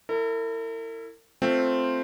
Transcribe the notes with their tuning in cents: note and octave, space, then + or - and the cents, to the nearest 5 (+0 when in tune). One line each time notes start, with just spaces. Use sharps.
E4 +0 A#4 -45
A3 +0 C4 +0 F4 +0